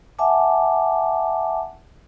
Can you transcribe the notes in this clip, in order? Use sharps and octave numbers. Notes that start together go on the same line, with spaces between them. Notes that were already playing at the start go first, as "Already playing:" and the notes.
E5 F#5 G#5 A5 D6